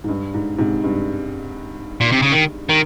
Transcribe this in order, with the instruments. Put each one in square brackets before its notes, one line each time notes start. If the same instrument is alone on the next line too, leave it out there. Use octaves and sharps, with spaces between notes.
[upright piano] G#2
G2
G#2
G#2 C3
G2
[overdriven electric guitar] A#2
C3
C#3
D#3
D#3